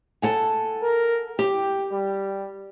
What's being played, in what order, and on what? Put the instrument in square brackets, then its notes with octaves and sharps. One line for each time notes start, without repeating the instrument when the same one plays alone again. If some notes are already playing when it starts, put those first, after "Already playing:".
[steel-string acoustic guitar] A4 F#5 G#5
[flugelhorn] A#4
[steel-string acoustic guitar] G4 [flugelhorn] G5
[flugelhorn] G3